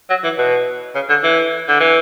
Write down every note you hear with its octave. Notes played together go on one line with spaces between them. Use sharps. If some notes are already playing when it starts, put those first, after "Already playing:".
F#3
E3
B2
C#3
D3
E3
D3
E3